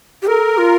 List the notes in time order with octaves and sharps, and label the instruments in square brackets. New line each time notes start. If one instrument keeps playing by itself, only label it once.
[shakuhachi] G4
[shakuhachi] A4 [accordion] A#4
[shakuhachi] F4